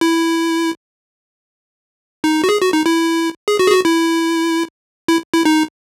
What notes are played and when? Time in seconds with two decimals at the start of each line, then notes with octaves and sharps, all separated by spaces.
0.01 E4
2.24 D#4
2.44 F#4
2.49 G#4
2.61 F#4
2.73 D#4
2.86 E4
3.48 G#4
3.59 F#4
3.67 G#4
3.72 F#4
3.85 E4
5.08 E4
5.34 E4
5.45 D#4